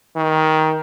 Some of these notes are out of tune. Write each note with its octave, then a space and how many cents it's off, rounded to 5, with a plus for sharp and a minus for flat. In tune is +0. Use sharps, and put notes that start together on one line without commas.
D#3 +15